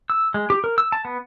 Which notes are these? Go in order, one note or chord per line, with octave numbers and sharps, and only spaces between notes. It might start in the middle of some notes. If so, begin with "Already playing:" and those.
E6
G#3
G4
A#4
E6
A5
B3